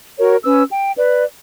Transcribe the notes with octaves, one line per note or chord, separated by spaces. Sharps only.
F#4 A#4 C#5
C#4 B4 E6
G5
B4 D5